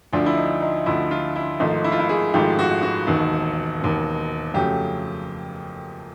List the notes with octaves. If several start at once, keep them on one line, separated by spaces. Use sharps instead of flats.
D2 D3 F3 D4
E4
D#4
D#4
D2 D3 F3 E4
F4
E4
G#1 G#2 F3 A3 D#4
E4
F4
E4
G#4
G#1 G#2 F3 A3 G4
F#4
F#4
E1 D#2 D#3
E1 D#2 D#3
F2 C#3 F#3 A3 G4